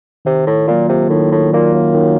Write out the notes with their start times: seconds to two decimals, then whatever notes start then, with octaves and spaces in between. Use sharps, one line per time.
0.25 C3 D#3
0.47 A2
0.68 A#2 F#3 A#3 F4
0.89 C3
1.10 A2 D#3
1.32 A2
1.52 A#2 F#3 A#3 F4
1.74 F#2
1.95 D#3